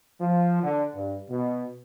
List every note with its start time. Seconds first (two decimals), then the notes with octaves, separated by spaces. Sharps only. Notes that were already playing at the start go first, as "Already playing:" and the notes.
0.21 F3
0.63 D3
0.95 G2
1.30 B2